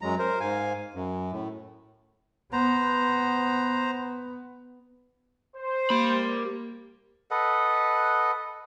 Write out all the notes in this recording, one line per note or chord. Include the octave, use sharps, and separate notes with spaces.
F#2 F#3 G#3 A#5
A#4 C5
G#2 F5 G#5
F#2
A2
B3 C5 A#5
C5
A#3 G4 B5
A4 B4 D#5 F#5